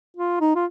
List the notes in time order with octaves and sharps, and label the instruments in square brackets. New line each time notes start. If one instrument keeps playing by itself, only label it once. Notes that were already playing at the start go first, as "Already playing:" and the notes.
[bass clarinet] F4
D#4
F4